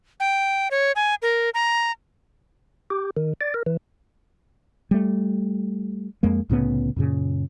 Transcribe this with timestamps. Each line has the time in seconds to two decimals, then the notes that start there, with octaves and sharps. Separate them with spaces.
0.20 G5
0.71 C#5
0.96 G#5
1.22 A#4
1.54 A#5
2.90 G4
3.17 D#3
3.41 D5
3.54 A#4
3.66 E3
4.91 G3 A3
6.23 F2 G#3 A#3
6.49 C2 A2 C#3 B3
6.96 F#2 A#2 C#3